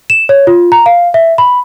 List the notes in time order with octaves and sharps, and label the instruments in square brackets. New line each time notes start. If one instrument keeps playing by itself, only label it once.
[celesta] E7
C#5
F4
A#5
F5
E5
B5